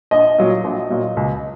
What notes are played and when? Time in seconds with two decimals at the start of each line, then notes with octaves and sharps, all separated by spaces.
0.11 A#1 D#5
0.38 A#2 F#3
0.64 A#1
0.90 A#2 F#3
1.17 C#2